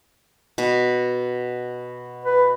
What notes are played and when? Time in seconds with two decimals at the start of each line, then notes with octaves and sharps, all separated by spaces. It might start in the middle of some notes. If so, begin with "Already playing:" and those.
0.58 B2
2.25 B4